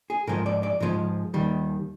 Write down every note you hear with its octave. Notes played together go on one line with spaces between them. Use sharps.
G#4
G#2 F3 G#3 A#4
D5
D5
G#2 F3 G#3
D#2 D#3 G3